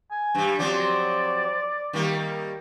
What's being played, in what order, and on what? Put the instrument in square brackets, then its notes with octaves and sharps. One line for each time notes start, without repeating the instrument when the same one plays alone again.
[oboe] G#5
[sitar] G2 G3
[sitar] F3 F#3 C4 [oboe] D5
[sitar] D#3 G3 A#3